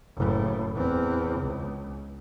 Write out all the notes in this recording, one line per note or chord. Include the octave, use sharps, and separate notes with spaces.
F#1 A2
E2 C4
C#2